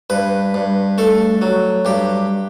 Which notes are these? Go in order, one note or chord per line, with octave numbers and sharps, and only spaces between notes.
G2 B4
G2
A3 A4
F#3
G2 G4